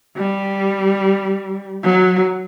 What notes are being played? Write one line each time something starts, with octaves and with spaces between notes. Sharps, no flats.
G3
F#3